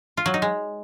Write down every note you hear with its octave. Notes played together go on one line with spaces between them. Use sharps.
F4
F#3
D#4
G#3